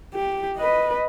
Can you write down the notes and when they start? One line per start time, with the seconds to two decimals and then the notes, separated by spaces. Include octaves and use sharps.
0.14 G4
0.57 B4 D#5